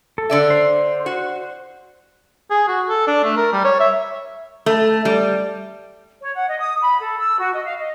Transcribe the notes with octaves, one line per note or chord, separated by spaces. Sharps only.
A4
D3 D5 E5
C5
F#4
G#4
F#4
A4
D4
A3
A#4
G3
C#5
E5
A3
G3
C#5
F#5
D#5
D#6
B5
A4
E6
F#4
D#5
F5
D#5